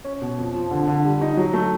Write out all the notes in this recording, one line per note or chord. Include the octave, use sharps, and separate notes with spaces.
C#4
B2
F2
F3
D3
D3
G3
D#4
F#3
A3